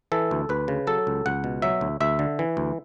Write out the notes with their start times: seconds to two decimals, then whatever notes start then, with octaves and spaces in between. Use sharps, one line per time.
0.12 E3 A4
0.31 D2
0.49 D2 B4
0.68 C#3
0.87 F#3 A4
1.07 C#2
1.26 C#2 F#5
1.44 B2
1.62 F#3 E5
1.81 D2
2.00 D2 E5
2.19 D3
2.39 E3
2.57 D2